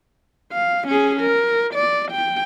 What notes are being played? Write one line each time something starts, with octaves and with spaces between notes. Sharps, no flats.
F5
C#4 G#4
A#4
D5
G5